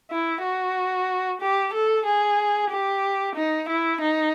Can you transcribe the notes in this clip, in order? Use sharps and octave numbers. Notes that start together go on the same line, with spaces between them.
E4
F#4
G4
A4
G#4
G4
D#4
E4
D#4